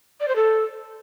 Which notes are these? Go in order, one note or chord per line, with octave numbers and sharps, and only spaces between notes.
D5
C5
A4